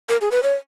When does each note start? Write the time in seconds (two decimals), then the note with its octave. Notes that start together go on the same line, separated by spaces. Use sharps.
0.09 A#4
0.21 G#4
0.31 B4
0.43 C#5